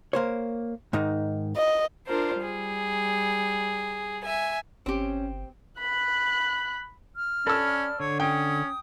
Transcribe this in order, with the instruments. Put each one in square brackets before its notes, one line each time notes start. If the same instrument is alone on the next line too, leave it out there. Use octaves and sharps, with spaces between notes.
[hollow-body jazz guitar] A#3 C5 C#5
G#2 D#3 D#4
[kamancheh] D#5
[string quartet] D4 F4 A#4 C5
G3 G#4
E5 G#5
[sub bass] G1 [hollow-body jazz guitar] C4 G4 [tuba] C#4
[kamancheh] B5 F#6
[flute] F6
[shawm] C#4 [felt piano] A4 E6 [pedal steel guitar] D5 B5
[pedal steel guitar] D3 [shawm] C#5
[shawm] C#4 [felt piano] G5 [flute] D#6